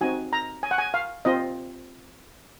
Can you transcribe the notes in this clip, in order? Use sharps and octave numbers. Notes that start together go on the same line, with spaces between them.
C4 D#4 F#4 G#5
A#5
G#5
F#5
G#5
F5
C4 F4 D#5